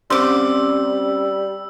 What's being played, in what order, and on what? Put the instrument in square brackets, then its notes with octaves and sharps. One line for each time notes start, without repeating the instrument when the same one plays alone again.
[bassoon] G3 [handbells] C4 C#4 C5 [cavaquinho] C6 D6 [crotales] E6